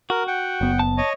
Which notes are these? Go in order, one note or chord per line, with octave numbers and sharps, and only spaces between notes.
F#4 A#4
F#5 G5
F#1 B3
A5
C#5 D#5